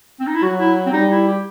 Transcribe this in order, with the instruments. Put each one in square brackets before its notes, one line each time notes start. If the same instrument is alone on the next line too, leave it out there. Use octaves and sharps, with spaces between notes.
[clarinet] C4
D#4
E4
[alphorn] F#3 [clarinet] F#4
[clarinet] E4
C4
[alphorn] G3 [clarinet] D#4
[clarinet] E4
G4